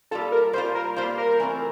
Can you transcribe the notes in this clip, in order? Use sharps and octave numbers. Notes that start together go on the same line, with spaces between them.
G3 A#3 F4 A4
A#4
G3 A#3 F4 C5
A#4
G3 A#3 F4 C5
A#4
E3 A3 C4